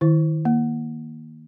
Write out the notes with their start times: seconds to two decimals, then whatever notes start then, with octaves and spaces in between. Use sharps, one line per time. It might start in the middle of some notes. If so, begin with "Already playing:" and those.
0.01 D#3 E4
0.45 A#3